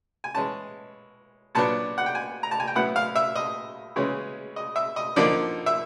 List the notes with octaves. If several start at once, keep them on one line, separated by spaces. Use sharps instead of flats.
G#5
E3 G#3 C#4 A5
A#2 F#3 B3 D4 A5
F#5
G5
G#5
A#5
A5
G#5
G5
A2 F#3 B3 E4 F#5
F5
E5
D#5
C#3 E3 G#3 C#4
D#5
E5
D#5
D3 F3 A#3 D#4 D5
E5